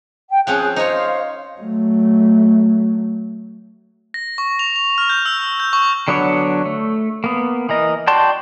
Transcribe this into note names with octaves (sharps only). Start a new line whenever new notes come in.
G5
F3 C4 C#4 G#4 F#6
D#4 C5 C#5 F5
F#3 A3
A#6
C#6
F7
F7
F6
G6
E6
G6
C#6
D3 F#3 B3 D4 C#5
A3
A#3 B3
E3 A#4 D#5
F#4 D5 G5 A5 C6